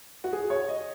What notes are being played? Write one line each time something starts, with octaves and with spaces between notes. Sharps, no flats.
F#4
G#4
C#5
D#5